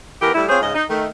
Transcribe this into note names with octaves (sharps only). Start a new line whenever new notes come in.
E3 B3 G4 A#4
G3 A3 E4
C4 F4 G#4 C5 C#5
G#2 C#3 D#5
D#4
D#3 A3